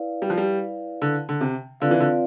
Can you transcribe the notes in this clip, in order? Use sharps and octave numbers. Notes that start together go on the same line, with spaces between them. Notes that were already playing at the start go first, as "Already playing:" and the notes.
Already playing: E4 B4 D5 F5
G3
F3
G3
D3
D3
C3
D3 C4 F4 B4 D5 F5
E3
D3